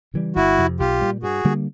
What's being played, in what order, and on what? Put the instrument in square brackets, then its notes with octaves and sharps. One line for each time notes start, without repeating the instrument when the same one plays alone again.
[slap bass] C#3 E3 G3
[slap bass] G1 [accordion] E4 F#4
[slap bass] F2 C3 F3
[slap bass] B1 [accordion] F4 G4
[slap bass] A#2 G3
[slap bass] G2 [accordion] F#4 G#4
[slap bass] D3 G3 A#3